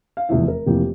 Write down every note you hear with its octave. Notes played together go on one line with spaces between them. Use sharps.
F5
F1 E2 E3 E5
A#4
F1 F2 E3 A#3 G4